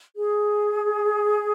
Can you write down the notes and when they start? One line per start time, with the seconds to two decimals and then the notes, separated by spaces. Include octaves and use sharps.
0.15 G#4